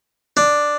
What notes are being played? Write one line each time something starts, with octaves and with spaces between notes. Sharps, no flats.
D4